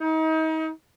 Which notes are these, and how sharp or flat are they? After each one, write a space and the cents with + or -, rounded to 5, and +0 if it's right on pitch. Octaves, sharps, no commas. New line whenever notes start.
D#4 +35